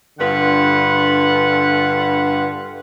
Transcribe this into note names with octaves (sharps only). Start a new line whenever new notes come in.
G2 D3 F4 B4 F#5